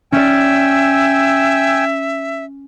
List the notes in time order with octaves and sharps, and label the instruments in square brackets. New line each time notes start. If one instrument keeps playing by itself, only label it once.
[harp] C#4 D5 [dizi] E5 [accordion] G5 G#5 E6